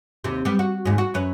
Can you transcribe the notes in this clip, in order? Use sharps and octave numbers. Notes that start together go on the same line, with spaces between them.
D#2 C3
G3 B3
F#4
D#2 G#2
F#4
F#2 B4 C#5